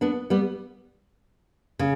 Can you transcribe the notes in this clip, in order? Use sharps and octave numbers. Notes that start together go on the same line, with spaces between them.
B3 D4
G3 B3
C#3